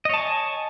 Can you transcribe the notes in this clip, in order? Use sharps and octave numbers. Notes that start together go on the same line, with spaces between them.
C#5 D#5 G#5 A5